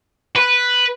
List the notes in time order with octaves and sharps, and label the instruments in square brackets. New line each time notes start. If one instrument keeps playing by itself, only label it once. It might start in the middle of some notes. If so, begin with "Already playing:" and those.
[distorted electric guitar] B4